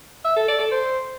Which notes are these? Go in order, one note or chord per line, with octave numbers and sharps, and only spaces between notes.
E5
A4
D5
A4
C5